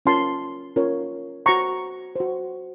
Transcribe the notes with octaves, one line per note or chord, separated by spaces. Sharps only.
C#4 F4 A#4 C#5 A5 C6
C#4 F4 A#4 C#5
F#4 C5 A#5 C#6
F#4 C5